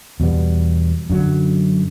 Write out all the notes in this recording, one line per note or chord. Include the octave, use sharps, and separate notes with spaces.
E2 B2 G3 B3
F#2 D3 F#3